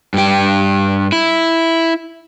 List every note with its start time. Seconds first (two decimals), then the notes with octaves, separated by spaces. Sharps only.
0.14 G2 G4
1.12 E4